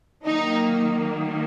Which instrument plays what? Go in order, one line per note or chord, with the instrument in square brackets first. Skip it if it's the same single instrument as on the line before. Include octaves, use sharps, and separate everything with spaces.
[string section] D#3 F#3 A#3 D#4